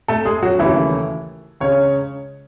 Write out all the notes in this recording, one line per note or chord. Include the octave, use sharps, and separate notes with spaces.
A3 A4
G#3 G#4
F#3 F#4
D#2 C#3 E3 F#3 A3 E4
C#2 C#3 G#3 C#4 C#5